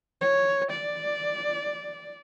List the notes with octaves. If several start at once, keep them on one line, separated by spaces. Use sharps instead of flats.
C#5
D5